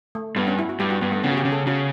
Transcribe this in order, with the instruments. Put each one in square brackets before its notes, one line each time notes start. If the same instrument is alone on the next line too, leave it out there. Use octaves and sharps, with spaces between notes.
[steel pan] A3
[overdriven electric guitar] G2 [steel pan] B3
[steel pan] C#4
E4
F#4
[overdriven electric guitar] G2 [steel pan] G4
[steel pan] F#4
[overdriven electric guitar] G2 [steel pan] B3
[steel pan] A3
[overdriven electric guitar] C#3 [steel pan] B3
[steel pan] F#4
G4
[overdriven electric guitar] C#3
[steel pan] A4
[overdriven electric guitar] C#3 [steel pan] F#4